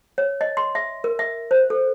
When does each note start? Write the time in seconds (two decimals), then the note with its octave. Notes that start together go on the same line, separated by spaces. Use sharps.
0.18 C#5
0.41 D#5
0.57 C6
0.75 E5
1.04 A#4
1.19 E5
1.51 C5
1.70 A4